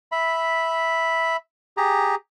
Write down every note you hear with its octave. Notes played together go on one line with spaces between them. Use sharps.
E5 B5
G4 G#4 A#5